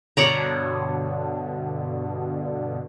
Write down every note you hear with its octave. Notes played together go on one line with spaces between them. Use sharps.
G2 B2 D3 C#5 D5 A#5